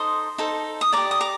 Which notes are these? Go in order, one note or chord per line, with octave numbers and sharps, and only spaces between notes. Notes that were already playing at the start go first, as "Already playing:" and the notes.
Already playing: D#4 A4 C5 C6 D#6
D#4 A4 C5
D#6
G4 D5 A#5 D6
D#6
A#5 D6